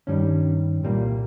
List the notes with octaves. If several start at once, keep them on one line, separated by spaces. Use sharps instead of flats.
G2 D#3 G3 C#4
C2 A#2 G3 A#3